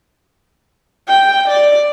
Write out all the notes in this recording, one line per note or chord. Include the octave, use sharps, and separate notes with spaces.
G5
D5